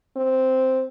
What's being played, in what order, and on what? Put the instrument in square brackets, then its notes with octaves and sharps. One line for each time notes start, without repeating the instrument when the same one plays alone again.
[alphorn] C4